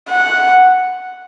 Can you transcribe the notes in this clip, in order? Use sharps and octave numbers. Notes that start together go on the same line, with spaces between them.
F#5